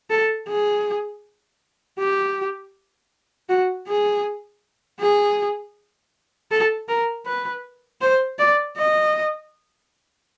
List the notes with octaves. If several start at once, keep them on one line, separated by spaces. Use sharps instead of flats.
A4
G#4
G4
F#4
G#4
G#4
A4
A#4
B4
C5
D5
D#5